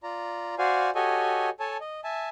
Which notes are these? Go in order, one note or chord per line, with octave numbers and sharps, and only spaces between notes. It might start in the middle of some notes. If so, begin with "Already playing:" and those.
F4 D5 A#5
F#4 C5 D5 F5 G#5
F#4 G4 A4 C#5 D#5 G#5
A4 C#5 G#5 A5
D#5
E5 G#5 A5